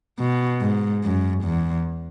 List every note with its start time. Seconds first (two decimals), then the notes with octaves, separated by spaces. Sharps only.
0.19 B2
0.61 G#2
1.04 F#2
1.45 E2